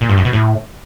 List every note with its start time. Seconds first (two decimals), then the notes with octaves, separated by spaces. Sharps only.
0.01 A#2
0.09 G2
0.17 F#2
0.25 B2
0.33 A2